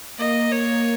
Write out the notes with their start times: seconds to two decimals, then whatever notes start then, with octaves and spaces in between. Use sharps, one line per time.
0.18 A#3 D#5
0.52 A#3 C#5